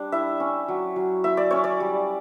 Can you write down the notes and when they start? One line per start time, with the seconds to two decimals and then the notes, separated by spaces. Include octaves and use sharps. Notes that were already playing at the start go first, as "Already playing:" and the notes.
Already playing: G3 D4
0.12 E4 E5
0.40 C#4
0.68 F#3
0.96 F#3
1.24 E4 E5
1.37 D5
1.51 C#4 C#5
1.64 D5
1.80 G3